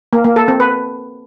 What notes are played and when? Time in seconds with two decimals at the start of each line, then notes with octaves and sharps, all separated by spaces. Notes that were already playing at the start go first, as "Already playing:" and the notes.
0.13 A#3
0.24 A#3
0.36 A4
0.48 C4
0.60 B4